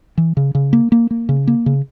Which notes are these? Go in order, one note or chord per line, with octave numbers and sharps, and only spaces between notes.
E3
C#3
C#3
A#3
A#3
A#3
C#3
A#3
C#3